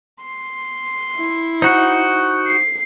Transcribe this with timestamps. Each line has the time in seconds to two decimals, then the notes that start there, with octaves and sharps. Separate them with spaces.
0.21 C6
1.17 E4
1.62 D#4 F#4 C5
2.47 C7